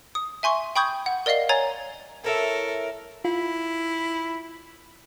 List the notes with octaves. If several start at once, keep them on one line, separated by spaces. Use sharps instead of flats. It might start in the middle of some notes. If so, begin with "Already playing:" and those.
D#6
E5 G#5 C6 C#6
G5 B5 C#6 D#6 G6 G#6
F#5
A#4 D5 D#5 F5 C7 G7
C#5 G#5 A#5 G#6 A6
E4 A4 A#4 C#5 E5
E4 F4